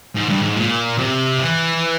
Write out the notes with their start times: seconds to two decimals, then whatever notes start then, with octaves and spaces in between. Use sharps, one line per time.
0.16 G#2
0.29 G2
0.43 G#2
0.57 A#2
0.98 C3
1.39 E3